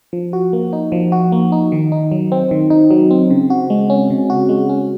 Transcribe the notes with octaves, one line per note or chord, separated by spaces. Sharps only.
F3
F#4
A#3
D#4
F3
F#4
A#3
D#4
D#3
D#4
F#3
C4
D#3
D#4
F#3
C4
C#3
F#4
G#3
C#4
C#3
F#4
G#3
C#4